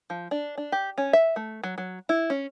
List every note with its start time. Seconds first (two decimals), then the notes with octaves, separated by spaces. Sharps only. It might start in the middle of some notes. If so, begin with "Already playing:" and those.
0.10 F3
0.31 D4
0.58 D4
0.72 G4
0.98 C#4
1.13 E5
1.36 A3
1.64 F#3
1.78 F#3
2.09 E4
2.30 C#4